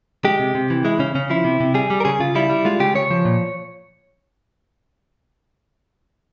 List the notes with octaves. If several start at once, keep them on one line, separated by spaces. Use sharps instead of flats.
G#3 G4
C3
C3
E3
G#3 E4
C#3 C#4
C#3 C#4
F3 E4
C3
C3
G3 G#4
G3
A#4
C#3 G#4
C#3 F4
G3 E4
G3
G#3 F4
C#3 G4
C#3 C#5
F3
A#2